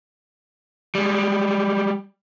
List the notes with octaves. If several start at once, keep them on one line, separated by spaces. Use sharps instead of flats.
G3 G#3